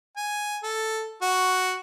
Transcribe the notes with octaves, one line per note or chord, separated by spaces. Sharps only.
G#5
A4
F#4